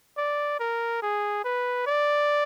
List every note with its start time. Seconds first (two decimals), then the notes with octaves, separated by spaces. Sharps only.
0.18 D5
0.60 A#4
1.02 G#4
1.44 B4
1.87 D5